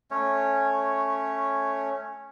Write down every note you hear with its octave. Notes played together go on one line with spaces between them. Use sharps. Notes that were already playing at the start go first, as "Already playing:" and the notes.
A3 C#4 C#5